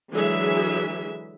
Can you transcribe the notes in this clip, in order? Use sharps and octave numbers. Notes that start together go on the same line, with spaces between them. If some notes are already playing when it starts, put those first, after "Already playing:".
D3 E3 F#3 G#3 G#4 E5